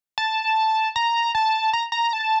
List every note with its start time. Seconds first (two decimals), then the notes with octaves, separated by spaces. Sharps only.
0.18 A5
0.96 A#5
1.35 A5
1.73 A#5
1.92 A#5
2.13 A5